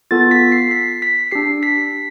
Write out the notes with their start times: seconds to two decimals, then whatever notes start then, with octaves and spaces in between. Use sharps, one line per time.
0.11 B3 F4 A4 A6
0.31 B6
0.52 C7
0.71 B6
1.02 B6
1.31 D4 G4 C7
1.63 B6